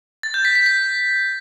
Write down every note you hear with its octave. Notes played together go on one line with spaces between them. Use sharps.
A6
G6
B6
B6
B6